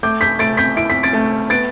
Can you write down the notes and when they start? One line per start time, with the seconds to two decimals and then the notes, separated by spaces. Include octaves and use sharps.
0.03 A3 D6 G6
0.21 G6 B6
0.39 A3 A6 D7
0.57 G6 B6
0.76 E4 D7
0.90 B6
1.03 A6 D7
1.13 A3
1.50 B3 A6 D7